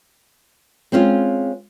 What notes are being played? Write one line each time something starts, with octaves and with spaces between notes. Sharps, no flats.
G#3 C4 C#4 F4